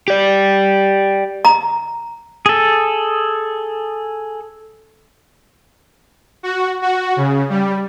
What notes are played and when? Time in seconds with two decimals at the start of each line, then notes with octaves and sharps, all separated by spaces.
0.08 G4 D5
1.45 A#5
2.46 G#4 A4
6.43 F#4
6.82 F#4
7.16 C#3
7.50 G3